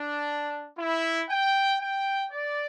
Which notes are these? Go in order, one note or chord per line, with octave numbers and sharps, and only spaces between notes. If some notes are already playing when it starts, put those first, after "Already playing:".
Already playing: D4
E4
G5
G5
D5